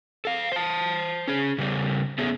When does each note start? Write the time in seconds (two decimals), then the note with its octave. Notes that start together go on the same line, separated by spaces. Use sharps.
0.25 A4 F5
0.52 C5 A5
1.28 C#4 G#4
1.58 C#3 G3
2.18 A3 B3 C#4 G#4